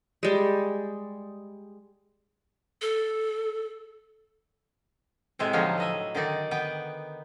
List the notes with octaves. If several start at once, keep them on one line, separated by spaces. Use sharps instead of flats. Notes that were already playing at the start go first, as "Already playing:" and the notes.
G3 G#3
A4
A2 C3 G#3 E5
D3 F3 F#3 D#4 F4 C#5
B4 D#5 E5
D3 D#3 D#4 D5
B3 B4 G5